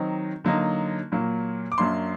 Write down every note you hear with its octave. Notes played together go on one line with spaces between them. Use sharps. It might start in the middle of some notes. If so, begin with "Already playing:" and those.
Already playing: D#3 F#3 C4 D#4
D3 F#3 A#3 D#4
A#2 F#3 A#3
D6
F#2 F#3 A#3 D4 C6